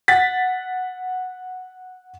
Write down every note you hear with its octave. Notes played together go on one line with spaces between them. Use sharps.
F#5 A6 B6